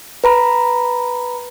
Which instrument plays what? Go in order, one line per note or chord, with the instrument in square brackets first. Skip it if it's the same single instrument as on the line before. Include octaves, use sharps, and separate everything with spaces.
[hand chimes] B4 A#5 B5